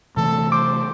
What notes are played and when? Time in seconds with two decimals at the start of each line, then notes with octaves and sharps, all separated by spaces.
0.17 C3 E3 A3 A4
0.52 C5 D6